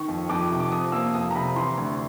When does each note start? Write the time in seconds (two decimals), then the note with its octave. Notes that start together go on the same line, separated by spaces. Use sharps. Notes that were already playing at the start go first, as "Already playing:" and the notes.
Already playing: D#3 C#6
0.08 F2
0.29 F2 D6
0.50 C3
0.60 D6
0.71 F3 D#6
0.92 A#3 E6
1.14 F2 D#6
1.31 A#5
1.35 C3 B5
1.56 E3 C6
1.77 D2